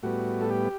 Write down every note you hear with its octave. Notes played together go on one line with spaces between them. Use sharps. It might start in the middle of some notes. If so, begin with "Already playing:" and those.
A2 G3 B3 F#4
A4
G4